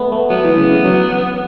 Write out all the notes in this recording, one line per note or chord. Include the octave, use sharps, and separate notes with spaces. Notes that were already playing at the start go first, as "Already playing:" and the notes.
Already playing: A3 B3
A3
F#3 B3
E3
C#3
C#3
F#3